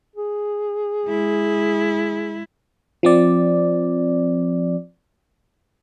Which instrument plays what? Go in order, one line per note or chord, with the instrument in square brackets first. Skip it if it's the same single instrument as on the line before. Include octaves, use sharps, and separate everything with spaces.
[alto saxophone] G#4
[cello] G#3 E4
[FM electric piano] F3 C4 D5